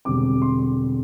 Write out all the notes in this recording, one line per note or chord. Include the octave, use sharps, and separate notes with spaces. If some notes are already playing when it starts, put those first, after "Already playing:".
E1 E2 D3 G3 C4 D6
C6